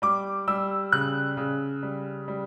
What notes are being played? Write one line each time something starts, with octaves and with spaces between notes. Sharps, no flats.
G3 D6
G3 E6
C#3 F#6
C#3
G3
G3